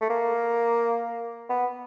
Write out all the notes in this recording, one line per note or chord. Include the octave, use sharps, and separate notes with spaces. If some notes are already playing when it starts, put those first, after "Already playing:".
A3
A#3
B3